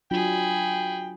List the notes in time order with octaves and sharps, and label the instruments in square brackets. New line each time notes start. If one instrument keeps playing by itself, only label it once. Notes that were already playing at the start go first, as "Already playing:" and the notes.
[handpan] F#3 D4 F4 [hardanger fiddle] G#4 B5 [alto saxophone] G5